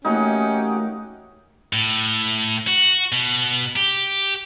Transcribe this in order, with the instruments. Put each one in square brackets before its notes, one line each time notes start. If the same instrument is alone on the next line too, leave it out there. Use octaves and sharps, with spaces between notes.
[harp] E3 A3 A#3 [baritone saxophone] C#4 [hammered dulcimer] D#4 [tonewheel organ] F#4 G4
[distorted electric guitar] A2
F#4
B2
G4